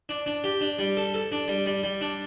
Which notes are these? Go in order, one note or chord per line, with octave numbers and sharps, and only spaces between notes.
D4
D4
G4
D4
G3
A4
A4
D4
G3
G3
G3
D4